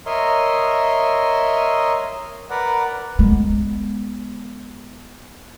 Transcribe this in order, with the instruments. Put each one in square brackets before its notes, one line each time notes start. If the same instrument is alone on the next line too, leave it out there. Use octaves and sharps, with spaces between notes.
[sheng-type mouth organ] A#4 C#5 D#5 E5 C6
A#4 B4 D5 F#5
[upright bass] G#3 B3